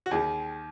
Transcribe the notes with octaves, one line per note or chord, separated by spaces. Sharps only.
F#4
D#2 D#3 G#4